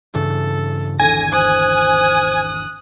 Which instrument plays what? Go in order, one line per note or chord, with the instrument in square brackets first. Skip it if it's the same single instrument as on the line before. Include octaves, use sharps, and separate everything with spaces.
[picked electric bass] G2 C#3 E3 [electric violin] A4
[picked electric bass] G#1 E2 D3 [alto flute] A4 [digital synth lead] G#5 [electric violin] A#6
[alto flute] C5 [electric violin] D#6 F#6